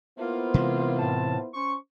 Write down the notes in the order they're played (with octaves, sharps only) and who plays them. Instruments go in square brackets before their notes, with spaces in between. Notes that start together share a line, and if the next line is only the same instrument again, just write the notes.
[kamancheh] A#3 F4 [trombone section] B3 E4 C5
[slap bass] C3 E3 G#3
[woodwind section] A2 A5
C#4 C5 C#6